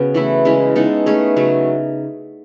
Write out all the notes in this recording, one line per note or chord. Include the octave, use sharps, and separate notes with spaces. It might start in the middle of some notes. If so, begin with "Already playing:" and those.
Already playing: C#3 B3 C#4 F#4
E3 A3 E4
C#3 G#3 C#4 E4
G#3 B3 D#4 A4
A3 C#4 G#4 B4
C#3 F#3 A3